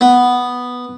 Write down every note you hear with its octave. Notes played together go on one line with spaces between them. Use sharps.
B3